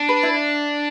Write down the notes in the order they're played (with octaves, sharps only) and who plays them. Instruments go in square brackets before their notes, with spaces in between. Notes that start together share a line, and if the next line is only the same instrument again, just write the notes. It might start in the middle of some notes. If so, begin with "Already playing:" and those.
Already playing: [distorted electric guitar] D4
[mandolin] B4
E4